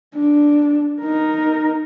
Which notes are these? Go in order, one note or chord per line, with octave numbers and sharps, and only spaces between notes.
D4
D#4 A#4